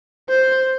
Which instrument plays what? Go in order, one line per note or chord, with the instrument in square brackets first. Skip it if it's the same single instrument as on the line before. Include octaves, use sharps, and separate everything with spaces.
[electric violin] C5